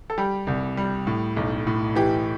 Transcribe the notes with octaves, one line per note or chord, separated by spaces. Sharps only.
A4
G3 G4
C2
G3
A2
B1
A2
E3 G4